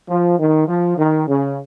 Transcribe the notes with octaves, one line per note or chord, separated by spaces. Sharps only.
F3
D#3
F3
D#3
C#3